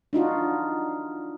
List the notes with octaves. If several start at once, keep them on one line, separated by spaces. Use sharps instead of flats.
D4 D#4 F4 F#4